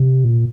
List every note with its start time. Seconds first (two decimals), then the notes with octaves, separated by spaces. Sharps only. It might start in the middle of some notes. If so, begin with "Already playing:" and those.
Already playing: C3
0.24 A#2